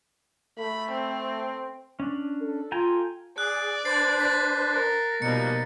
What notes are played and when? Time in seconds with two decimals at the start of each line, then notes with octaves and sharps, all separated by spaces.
0.59 A3 B5
0.91 C4
2.00 C#4 D4
2.41 A4
2.72 F4 G5 G#5 A#5
3.38 G#4 D5 F#6
3.85 D4 B4 C5 A6 C7
4.19 A6 B6
4.73 A#4
5.22 B2 F3 G3 A#3 D#4 C#7